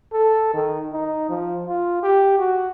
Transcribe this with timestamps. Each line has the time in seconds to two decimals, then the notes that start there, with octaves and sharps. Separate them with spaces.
0.13 A4
0.54 D#3
0.93 D#4
1.29 F3
1.67 F4
2.03 G4
2.38 F#4